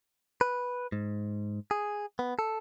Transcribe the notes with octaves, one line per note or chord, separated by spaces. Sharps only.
B4
G#2
G#4
B3
A4